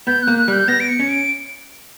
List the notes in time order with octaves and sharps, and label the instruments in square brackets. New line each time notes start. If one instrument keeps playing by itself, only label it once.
[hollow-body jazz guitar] B3 [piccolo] G6
[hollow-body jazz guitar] A#3 [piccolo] F#6
[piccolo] F#6
[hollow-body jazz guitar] G3 [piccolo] G6
[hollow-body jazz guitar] B3 [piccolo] A#6
[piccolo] D7
C#7
[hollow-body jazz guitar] C#4
[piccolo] D7